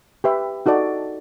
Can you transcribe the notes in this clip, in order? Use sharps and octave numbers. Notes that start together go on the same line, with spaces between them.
G4 B4 E5
D#4 F#4 A4 D5